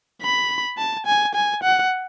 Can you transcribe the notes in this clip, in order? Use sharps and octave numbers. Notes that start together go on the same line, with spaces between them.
B5
A5
G#5
G#5
F#5